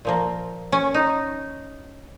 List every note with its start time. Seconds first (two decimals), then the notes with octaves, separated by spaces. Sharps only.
0.05 A#2 F3 A#3
0.72 C#4
0.94 D#4